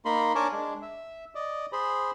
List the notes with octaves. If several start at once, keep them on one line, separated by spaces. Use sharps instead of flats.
A#3 D#4 B5 C6
D4 A#4 C#5 G#5 A5 D6
G#3 D4
E5
D5 D#5
G#4 C5 B5